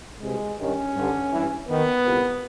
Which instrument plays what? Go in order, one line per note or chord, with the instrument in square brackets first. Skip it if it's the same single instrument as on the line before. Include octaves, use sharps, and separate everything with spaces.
[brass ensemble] C2 B2 G#3
G2 D#3 C#4
G2 D3
G2 E3
D#2 D#3 B3
C2 A#2